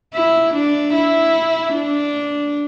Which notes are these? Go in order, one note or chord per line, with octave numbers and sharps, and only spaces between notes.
E4
D4
E4
D4